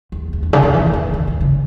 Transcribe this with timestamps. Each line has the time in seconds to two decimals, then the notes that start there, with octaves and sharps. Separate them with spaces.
0.12 E2
0.33 E2
0.43 G2
0.53 C#3
0.63 D#3
0.73 E3
0.86 E3
0.93 D#3
1.14 E3
1.27 D#3
1.41 C#3